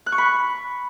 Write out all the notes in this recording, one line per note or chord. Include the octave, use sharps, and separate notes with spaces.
F#6
C#6
B5